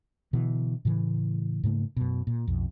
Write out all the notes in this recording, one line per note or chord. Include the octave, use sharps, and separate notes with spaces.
B2 D3 E3
A2 C#3 E3
G#2 C#3 A3 A#3
F#2 B2
A#2
B1 F2